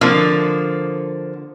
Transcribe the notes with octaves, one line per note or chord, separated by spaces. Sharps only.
D3 F3 A#3